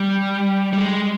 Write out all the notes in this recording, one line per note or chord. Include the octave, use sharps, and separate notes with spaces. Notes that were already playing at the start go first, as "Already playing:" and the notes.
Already playing: G3
G3
G#3